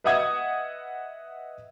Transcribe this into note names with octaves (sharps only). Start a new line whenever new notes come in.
B4 D#5 E5 F#5 D#6 G#6